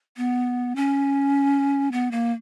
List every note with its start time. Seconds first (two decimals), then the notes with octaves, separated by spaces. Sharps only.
0.17 B3
0.76 C#4
1.92 B3
2.11 A#3